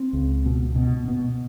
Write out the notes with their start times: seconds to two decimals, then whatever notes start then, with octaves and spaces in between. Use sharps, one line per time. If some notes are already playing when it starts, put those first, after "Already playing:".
Already playing: C4
0.13 C#2
0.46 B2
0.76 B2
1.08 B2